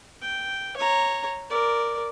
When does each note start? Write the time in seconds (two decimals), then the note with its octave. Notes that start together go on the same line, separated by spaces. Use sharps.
0.22 G5
0.76 C#5 A#5
1.50 A#4 D5